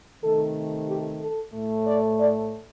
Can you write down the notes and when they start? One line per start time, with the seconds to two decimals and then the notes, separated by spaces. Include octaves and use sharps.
0.21 C3 D#3 A3 A4
0.87 G4
1.20 A4
1.53 A2 A3
1.86 D5
2.18 D5